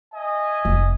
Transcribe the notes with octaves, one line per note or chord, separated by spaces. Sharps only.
D#5 E5 G#5
F1